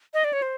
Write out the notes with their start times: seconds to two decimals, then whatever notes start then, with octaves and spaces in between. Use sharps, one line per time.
0.14 D#5
0.24 D5
0.33 C#5
0.42 C5